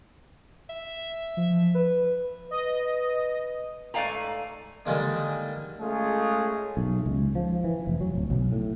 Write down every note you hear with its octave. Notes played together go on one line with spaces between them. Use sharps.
E5
F3
B4
B4 D#5
G#2 A3 D5 F5 G#5 A#5
D3 D#3 G3 G#3 A#3 D4
G#3 A3 C#4 F4 G#4
B1
C#2
F3
E3
F1
F#3
D1
B1
A2